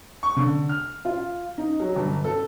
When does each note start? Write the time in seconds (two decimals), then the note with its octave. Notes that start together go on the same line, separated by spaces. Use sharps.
0.23 C#6
0.37 D3
0.69 F6
1.05 F4
1.58 D#4
1.80 F#3
1.96 G1
2.24 A4